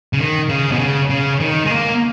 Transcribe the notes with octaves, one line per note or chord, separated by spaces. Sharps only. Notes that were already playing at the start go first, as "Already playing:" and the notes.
C#3
D#3
C#3
B2
C#3
C#3
D#3
G#3
A#3